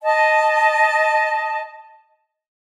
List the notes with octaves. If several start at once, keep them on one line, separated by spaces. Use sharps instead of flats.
D#5 A5